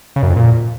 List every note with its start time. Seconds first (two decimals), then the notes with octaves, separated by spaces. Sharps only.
0.16 C#3
0.23 F#2
0.29 F2
0.36 A#2